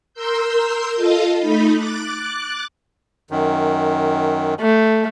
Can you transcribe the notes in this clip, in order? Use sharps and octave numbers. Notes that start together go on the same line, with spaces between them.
A#4 C6 E6 G6
F4 A4 D#5 F5
A3 D#4 B5
D6 F#6 A6
F#2 D#3
A3